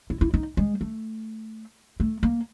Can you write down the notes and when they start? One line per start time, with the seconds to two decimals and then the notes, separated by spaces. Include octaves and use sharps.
0.10 E4
0.21 E4
0.34 D#4
0.57 G#3
0.81 A3
2.00 A3
2.23 A#3